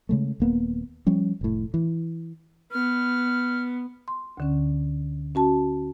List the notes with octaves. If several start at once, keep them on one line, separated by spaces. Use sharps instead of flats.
C#3 G#3 A3
D#1 A#3 B3
F3 G3 C#4
F1 A2
E3
B3 F6
C6
D2 D3 C#4
C#4 F#4 A5